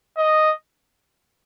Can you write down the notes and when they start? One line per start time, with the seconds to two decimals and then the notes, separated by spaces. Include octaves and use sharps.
0.17 D#5